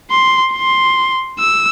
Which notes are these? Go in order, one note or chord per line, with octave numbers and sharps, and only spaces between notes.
C6
C6
E6